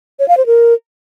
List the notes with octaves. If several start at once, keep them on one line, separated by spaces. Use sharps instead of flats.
C#5
F5
C5
A#4